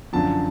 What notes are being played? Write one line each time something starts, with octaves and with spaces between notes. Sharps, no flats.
F#2 D3 F3 A5